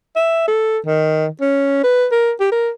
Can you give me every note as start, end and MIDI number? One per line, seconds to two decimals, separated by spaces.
0.16 0.44 76
0.48 0.79 69
0.86 1.26 51
1.41 1.80 61
1.84 2.06 71
2.12 2.33 70
2.40 2.47 67
2.52 2.70 70